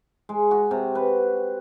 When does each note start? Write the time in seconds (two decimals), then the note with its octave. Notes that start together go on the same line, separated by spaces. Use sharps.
0.29 G#3
0.51 F#4
0.71 C3
0.95 B4